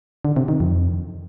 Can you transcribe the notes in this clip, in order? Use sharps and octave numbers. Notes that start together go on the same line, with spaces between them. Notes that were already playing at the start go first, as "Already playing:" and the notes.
D3
C3
D#3
F2